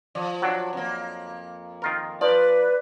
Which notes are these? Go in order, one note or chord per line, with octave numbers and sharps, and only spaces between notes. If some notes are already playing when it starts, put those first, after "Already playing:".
F3 D5
F#3 D4
F2 A#3
D#3 F4 A#4
F3 B4 D5